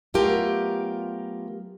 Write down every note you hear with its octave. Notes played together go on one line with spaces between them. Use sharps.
F#3 A3 B3 F4 G4 A#4